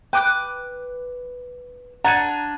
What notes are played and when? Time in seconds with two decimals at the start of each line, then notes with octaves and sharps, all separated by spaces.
0.13 B4 G5 D6 F#6
2.05 D4 F#5 A#5 G#6 D#7